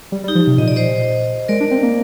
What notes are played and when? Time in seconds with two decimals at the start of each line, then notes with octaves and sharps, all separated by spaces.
0.12 G3
0.24 G3
0.28 D#4 G4
0.35 F3
0.47 C3
0.58 A#2 D#5
0.68 D5
0.76 C5 D#5
1.48 G#3 A#4 D5
1.60 D4
1.71 C4
1.83 A#3